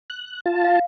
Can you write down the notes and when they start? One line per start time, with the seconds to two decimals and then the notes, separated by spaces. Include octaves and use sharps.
0.10 F#6
0.46 F4 A5
0.64 F5